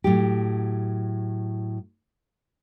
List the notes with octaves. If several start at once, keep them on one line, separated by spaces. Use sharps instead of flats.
A2 F#3 G4